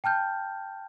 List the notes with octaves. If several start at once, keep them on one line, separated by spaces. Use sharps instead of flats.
G5 A5 F6 G6